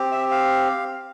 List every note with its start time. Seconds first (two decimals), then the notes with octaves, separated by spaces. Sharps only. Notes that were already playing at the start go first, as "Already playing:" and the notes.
Already playing: C4 G4
0.12 E5
0.31 F5